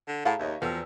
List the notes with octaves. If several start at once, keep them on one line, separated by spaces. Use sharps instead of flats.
D3
A2 G#4 F5 F#5 A5 A#5
D#2 C#5 D#5 E5
E2 F3 A3 F#4 B4 G5 A5 E6